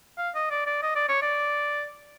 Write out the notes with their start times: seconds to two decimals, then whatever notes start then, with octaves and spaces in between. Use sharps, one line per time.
0.18 F5
0.35 D#5
0.51 D5
0.67 D5
0.83 D#5
0.96 D5
1.09 C#5
1.22 D5